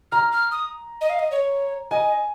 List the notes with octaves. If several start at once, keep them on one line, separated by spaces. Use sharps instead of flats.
A#5 F6
F6
D#6
D#5
F5
D#5
C#5
D#5 G#5